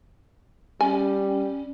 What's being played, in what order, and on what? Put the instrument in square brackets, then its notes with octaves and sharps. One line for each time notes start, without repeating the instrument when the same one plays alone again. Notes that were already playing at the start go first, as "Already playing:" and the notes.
[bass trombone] G3 [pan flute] C#4 [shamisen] G#5